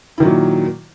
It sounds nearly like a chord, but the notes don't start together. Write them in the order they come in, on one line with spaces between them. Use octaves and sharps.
E4 D#3 F#3 A#2